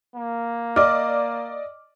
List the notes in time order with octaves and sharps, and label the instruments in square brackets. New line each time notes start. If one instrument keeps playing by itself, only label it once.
[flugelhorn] A#3
[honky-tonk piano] D5 D#5 [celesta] D6 F6